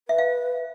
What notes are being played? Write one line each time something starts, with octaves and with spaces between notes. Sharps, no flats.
B4 E5
F5